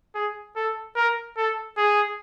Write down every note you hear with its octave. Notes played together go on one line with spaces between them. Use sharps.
G#4
A4
A#4
A4
G#4